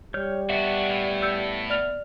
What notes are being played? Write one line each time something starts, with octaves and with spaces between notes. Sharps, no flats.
G3 C#5 F6 G6
B3 D4 F#4 E5 F#5
A2
E6 G6 C#7
D5 F6 F7